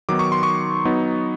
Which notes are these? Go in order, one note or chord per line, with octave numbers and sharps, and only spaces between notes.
D#3 F#3 B3 D#4 D6
C#6
C6
C#6
F#3 B3 D#4